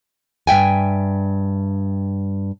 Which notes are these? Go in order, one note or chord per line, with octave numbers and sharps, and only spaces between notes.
G2 E5 G5 G#5